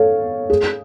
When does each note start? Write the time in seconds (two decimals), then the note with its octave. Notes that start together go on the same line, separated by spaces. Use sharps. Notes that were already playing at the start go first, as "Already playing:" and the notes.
Already playing: A4 C#5 F5
0.50 G#4